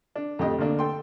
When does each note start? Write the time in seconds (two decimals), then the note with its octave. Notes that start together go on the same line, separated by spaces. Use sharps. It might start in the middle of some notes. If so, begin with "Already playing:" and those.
0.16 D4
0.39 F2 A2 G4 D#5
0.58 D2 D3 A#3 D4
0.79 A4 G5 C6